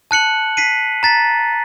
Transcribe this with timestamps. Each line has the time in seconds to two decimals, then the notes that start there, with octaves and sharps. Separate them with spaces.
0.11 A5 F#6 C#7 F#7
0.57 B6 C7 D#7
1.03 A#5 A6 B6